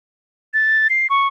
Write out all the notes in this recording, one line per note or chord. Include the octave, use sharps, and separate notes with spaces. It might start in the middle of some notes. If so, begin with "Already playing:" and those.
A6
C7
C#6